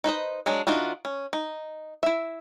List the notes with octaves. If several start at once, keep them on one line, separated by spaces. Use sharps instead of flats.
D#4 B4 C5 D#5
F#3 G#3 D4 G#4
E3 D4 D#4 F4 F#4
C#4
D#4
E4 E5